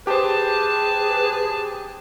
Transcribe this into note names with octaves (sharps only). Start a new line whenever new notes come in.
G4 G#4 B4 C5 A5